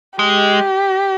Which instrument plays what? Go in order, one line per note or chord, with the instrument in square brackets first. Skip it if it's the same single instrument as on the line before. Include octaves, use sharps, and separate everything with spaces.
[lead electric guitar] G#3 [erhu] G4